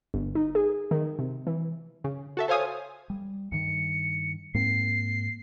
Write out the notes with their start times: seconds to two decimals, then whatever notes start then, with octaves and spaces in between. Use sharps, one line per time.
0.14 G1
0.35 D#4
0.55 G#4
0.91 D#3
1.19 C3
1.47 E3
2.04 C#3
2.37 F#4 A4 E5
2.48 A4 C5 C#5 F5 G#5 D#6
3.10 G3
3.52 G2 D#3 C#7
4.54 G#2 A#3 C4 C7